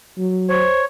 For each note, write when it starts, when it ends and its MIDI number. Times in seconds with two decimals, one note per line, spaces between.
0.18 0.67 54
0.49 0.82 72
0.49 0.85 73